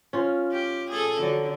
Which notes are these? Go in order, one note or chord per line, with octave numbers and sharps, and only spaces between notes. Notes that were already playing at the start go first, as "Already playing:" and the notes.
C#4 F4
G4
G#4 A4
D3 F#3